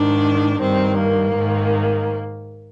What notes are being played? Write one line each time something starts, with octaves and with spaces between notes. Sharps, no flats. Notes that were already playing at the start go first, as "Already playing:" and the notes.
Already playing: G#2 D#3 D4
G2 D#3 C4
A#3
G#2 D#3